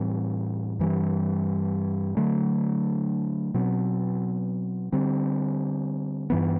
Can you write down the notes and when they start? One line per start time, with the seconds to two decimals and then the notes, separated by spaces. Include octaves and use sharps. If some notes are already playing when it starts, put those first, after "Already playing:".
Already playing: A2 E3 G3 C4
0.79 G2 E3 G3
2.17 D3 F#3 A3 D4
3.54 B2 F#3 C4
4.92 D3 G3 C4
6.30 G2 E3 B3